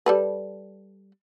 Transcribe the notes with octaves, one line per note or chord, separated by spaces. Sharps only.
G3 A4 B4